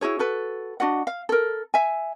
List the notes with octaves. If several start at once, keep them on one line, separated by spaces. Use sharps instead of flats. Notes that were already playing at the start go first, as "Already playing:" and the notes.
E4 F#4 G#4 C#5
F#4 A4 B4
D4 F#4 D#5 F#5
F5
A4 A#4
E5 G#5